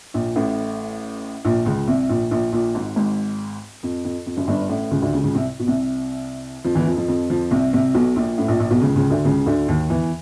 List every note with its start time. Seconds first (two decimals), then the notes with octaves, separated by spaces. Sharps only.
0.14 A#1 A#2
0.36 A1 A2
1.45 A#1 A#2
1.66 C#2 C#3
1.88 C2 C3
2.09 A#1 A#2
2.31 A#1 A#2
2.52 A#1 A#2
2.75 G#1 G#2
2.96 G#1 G#2
3.83 F2
4.05 F2
4.26 F2
4.37 F#1 F#2
4.48 G1 G2
4.69 A1 A2
4.91 C#2 C#3
5.02 D2 D3
5.13 C#2 C#3
5.24 C#2 C#3
5.35 C2 C3
5.59 B2
5.67 C2 C3
6.64 F2 F3
6.75 E2 E3
6.87 F2 F3
6.97 F2 F3
7.08 F2 F3
7.30 F2 F3
7.51 C2 C3
7.73 C2 C3
7.95 B1 B2
8.16 A#1 A#2
8.38 A1 A2
8.48 A#1 A#2
8.60 A#1 A#2
8.70 B1 B2
8.81 C#2 C#3
8.96 C#2 C#3
9.10 D2 D3
9.25 C#2 C#3
9.46 D2 D3
9.67 D#2 D#3
9.89 E2 E3